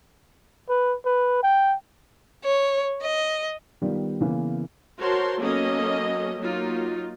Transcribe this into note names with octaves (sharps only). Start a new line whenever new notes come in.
B4
B4
G5
C#5
D#5
D#3 G3 B3 F4
C#3 E3 A#3 B3
F#4 A#4 C5 C#5 A5 C6
F#3 A#3 B3 C#4 A4 D#5
F#3 A#3 D#4 F4